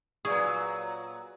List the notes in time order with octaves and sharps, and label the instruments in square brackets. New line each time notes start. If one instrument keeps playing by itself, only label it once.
[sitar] A#2 F#3 [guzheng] G#4 [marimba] B4 D5 C#6 [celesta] F5 D#6